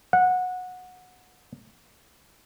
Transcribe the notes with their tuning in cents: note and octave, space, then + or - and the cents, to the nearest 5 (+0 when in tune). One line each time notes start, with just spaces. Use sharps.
F#5 -15